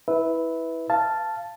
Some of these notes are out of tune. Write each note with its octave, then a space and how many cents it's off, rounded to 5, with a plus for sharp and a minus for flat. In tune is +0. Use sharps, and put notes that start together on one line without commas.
E4 -15 B4 +0 E5 -15
F5 -15 A5 +0